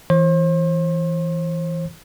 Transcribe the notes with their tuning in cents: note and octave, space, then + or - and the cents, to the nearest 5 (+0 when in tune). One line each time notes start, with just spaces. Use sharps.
E3 +0 C5 +40